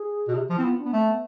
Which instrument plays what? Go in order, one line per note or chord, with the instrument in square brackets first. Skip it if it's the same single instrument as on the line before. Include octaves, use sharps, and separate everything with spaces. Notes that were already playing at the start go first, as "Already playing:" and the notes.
Already playing: [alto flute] G#4
[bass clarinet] B2
C3
F3
[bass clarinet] C4 [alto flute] E4
[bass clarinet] B3 [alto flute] F4
[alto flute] D4
[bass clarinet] B3
[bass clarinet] A3 [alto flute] C4
[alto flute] B3